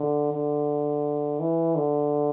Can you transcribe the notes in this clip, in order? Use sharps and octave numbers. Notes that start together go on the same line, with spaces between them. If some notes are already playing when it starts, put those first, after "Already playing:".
Already playing: D3
D3
E3
D3